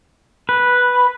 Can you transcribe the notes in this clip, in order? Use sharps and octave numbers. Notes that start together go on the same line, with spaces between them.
B4